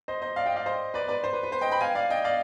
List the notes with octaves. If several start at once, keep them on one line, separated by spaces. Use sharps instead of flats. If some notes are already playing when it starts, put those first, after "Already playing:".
C5 D#5
C5 D#5
D5 F5
D#5 G5
D5 F5
C5 D#5
B4 D5
B4 D5
C5
B4
B4
C5
D#5 G5
G5 B5
F5 G#5
D5 F5
D#5 G5
D5 F5